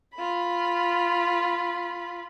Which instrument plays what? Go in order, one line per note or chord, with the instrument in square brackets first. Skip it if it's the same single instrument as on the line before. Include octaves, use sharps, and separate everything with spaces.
[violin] F4 B5